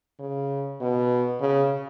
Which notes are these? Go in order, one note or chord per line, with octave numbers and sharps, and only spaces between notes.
C#3
B2
C#3